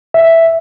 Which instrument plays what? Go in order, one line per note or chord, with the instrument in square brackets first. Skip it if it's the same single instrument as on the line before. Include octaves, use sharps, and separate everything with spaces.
[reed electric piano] E5